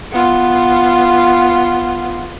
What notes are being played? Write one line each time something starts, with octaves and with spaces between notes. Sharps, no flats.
B3 F4